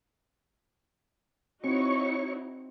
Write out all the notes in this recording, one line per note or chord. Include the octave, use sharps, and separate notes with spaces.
C4 D#4 E4 F#4 C#5 C#6